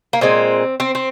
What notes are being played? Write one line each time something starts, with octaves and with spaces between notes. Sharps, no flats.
A#3
A#2 G#3 C4
C4
C4